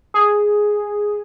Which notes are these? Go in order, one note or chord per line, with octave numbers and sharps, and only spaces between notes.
G#4